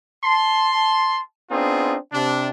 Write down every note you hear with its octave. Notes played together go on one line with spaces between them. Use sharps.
A5 C6
B3 C4 D4 D#4 F4 G#4
C3 D4